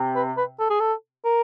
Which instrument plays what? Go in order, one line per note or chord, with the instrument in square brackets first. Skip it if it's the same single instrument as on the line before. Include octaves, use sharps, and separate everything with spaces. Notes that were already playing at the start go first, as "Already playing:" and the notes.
Already playing: [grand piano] C3
[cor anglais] B4
B4
A4
G#4
A4
A#4